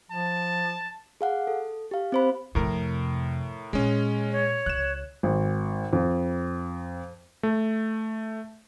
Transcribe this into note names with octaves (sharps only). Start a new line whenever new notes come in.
F3 A5
G#4 F5 F#5
A4
G4 F5
C4 C5 B5
F2 A2 C3 A#4
A#2 G#3 C#4
C#5
C#2 F#6 E7
G#1
F2
A3